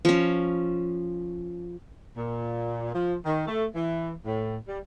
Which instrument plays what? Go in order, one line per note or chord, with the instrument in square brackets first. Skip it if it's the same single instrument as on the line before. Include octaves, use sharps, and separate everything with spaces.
[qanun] F3 C#4
[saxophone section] A#2
F3
D#3
A3
E3
A2
G3